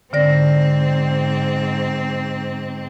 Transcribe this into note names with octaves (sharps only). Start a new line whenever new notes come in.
G#2 D3 C4 D5 A#6